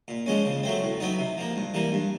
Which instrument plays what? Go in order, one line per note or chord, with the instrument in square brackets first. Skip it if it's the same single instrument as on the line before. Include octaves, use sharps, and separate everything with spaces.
[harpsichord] A#2
F3 G#3 C#4
C#3
F#3 A3 C4
A2
F#3 B3 D#4
C3
F3 A#3
G2
E3 G3 A#3
G2